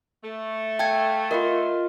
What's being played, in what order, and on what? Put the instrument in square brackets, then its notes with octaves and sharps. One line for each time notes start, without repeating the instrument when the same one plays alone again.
[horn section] A3
[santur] F5 [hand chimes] G5 A5 G#6
[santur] F4 B4 D#5 [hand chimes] A#4